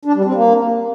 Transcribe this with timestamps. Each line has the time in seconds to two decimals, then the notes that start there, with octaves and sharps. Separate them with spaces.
0.05 D4
0.15 G3
0.25 C4
0.35 A#3